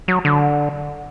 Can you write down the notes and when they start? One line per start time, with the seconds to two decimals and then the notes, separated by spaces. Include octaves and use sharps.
0.08 F#3
0.25 D3